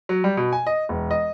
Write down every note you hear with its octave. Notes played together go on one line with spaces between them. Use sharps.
F#3
G3
B2
G#5
D#5
E1
D#5